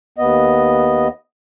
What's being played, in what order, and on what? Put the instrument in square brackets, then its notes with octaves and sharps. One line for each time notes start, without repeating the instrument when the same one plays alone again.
[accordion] D#2 B3 D#5